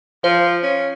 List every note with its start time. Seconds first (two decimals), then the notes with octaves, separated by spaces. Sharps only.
0.24 F3 C5
0.63 C#4